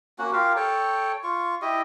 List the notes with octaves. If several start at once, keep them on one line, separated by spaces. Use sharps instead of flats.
A#3 C#4 F#4 F#5
F4 G4 A#4 F5
A4 C#5 G5
F4 C#6
E4 G4 D#5